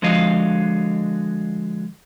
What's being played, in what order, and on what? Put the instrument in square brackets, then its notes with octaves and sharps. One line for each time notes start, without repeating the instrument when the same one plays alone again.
[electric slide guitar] D3 F3 G#3 F#4 D#5 F5